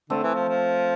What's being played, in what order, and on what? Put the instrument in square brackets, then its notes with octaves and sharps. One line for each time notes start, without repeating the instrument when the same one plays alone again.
[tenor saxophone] D3 [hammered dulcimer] A3 C4
[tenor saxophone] E3
F3
F3